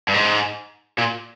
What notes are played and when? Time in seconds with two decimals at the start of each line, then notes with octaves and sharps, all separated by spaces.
0.08 G2
0.14 G#2
0.98 A#2